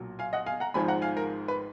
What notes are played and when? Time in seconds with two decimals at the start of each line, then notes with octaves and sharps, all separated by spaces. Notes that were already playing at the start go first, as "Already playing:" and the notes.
Already playing: B1 A#2 F#3
0.19 F5 G#5
0.33 D#5 F#5
0.46 F5 G#5
0.60 F#5 A#5
0.74 G#1 G#2 F3 G#5 B5
0.88 F#5 A#5
1.02 F5 G#5
1.17 A#4
1.48 B4